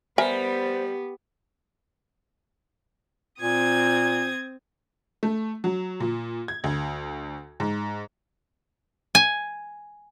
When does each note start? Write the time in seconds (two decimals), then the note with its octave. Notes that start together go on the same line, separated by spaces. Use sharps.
0.18 G3 B3 A#4 C5 E5 G#5
3.41 A#2 C4 D#6 G#6
5.23 A3
5.64 F#3
6.00 A#2
6.48 G#6
6.64 D2
7.60 G#2
9.15 G#5